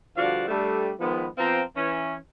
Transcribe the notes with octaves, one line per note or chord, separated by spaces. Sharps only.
G2 D3 F3 F#4 D5 F5
G3 A3 D4
D#3 F3 G#3 B3
F3 B3 C4 F5 G5 A#5
E3 C#4